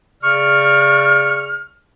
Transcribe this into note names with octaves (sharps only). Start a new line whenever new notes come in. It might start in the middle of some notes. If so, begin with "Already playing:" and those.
C#3 D5 C#6 F6